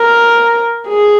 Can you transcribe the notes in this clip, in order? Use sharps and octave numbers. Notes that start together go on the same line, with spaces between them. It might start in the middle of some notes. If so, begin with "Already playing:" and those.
Already playing: A#4
G#4